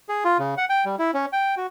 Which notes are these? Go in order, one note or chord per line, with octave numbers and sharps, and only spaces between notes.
G#4
F4
C#3
F#5
G5
G3
E4
C#4
G5
F#4